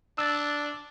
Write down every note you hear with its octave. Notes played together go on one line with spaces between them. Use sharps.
D4 E6 A6